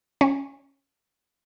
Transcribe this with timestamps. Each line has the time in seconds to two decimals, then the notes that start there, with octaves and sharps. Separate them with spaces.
0.21 C#4